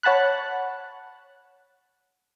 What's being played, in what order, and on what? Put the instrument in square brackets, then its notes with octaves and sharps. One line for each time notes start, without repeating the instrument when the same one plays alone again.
[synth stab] C#5 F#5 A5 B5 F#6